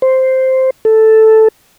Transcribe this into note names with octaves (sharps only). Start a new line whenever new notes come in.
C5
A4